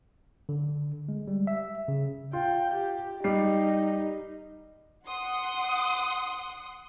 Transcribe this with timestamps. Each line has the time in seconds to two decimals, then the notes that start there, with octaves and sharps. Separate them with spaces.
0.49 D3
1.09 G#3
1.28 G3
1.47 E5
1.88 C#3
2.33 F4 G5
2.75 G4
3.24 G3 D#4 C7
5.07 F#5 C6 D#6